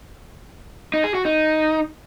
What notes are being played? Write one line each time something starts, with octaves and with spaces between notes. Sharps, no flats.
D#4
G#4
F#4
D#4